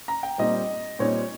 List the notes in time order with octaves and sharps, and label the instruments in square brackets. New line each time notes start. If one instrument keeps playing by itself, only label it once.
[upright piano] A#5
G5
A#2 G3 C4 D#4 D#5
A#2 G3 C4 D#4 C#5